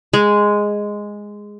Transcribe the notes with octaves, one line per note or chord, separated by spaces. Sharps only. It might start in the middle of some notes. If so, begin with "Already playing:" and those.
G#3